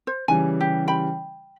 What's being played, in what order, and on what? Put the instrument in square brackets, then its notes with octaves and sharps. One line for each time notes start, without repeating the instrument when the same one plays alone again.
[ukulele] C5
[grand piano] C#3 E3 G3 [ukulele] G#5
[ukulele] G4
G5 B5